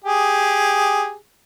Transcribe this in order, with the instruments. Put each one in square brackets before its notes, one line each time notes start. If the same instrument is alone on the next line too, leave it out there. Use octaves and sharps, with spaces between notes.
[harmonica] G4 G#4